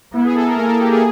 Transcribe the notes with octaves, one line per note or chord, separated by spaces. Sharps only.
B3 E4
G#4
A4
A#4
A#3 A#4
A4
G4
G#4